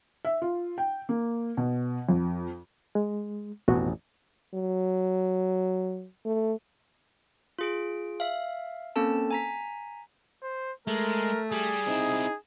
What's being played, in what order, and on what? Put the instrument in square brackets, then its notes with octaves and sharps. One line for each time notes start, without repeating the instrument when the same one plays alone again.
[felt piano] E5
F4
G5
A#3
B2
F2
[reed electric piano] G#3
[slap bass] A1 F2 [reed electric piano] B2 F#4
[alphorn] F#3
A3
[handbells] F4 G#4 D7
E5 F5
A#3 C4 C#4 A4 A5
G#5 A#5 B6
[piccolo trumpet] C5
[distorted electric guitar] G#3 [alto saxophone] A3 [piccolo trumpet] A#4
[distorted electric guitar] G3 [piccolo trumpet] G#4
[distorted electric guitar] C4 E4 [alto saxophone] D#4